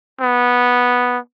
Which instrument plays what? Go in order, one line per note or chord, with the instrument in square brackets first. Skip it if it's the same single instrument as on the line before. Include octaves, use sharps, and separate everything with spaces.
[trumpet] B3